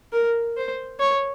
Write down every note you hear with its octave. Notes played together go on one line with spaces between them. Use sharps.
A#4
C5
C#5